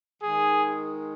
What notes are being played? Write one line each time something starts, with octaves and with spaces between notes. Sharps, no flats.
D#3 G#3 G#4